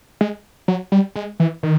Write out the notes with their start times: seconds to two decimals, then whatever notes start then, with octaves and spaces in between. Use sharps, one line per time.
0.21 G#3
0.68 F#3
0.92 G3
1.16 G#3
1.40 E3
1.63 D#3